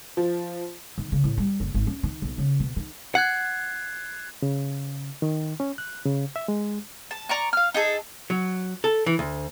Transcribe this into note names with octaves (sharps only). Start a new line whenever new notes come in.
F3
D#3
C#3
A2
G3
F#1
G#1
C#4
D#3
B1
C#3
B2
D#3
F#5 F#6 G#6 C7
C#3
D#3
C#4
F#6
C#3
E5
G#3
A5
D5 A#5 C#6
F5 F6
D#4 G#4 A4
F#3
A4
E3
D2